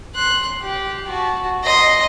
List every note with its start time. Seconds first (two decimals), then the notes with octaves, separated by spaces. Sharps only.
0.15 C6 F#6
0.61 G4
1.07 F#4 A5
1.64 D#5 C6